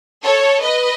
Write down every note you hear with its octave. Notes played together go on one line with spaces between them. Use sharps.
A4 C#5
B4 D#5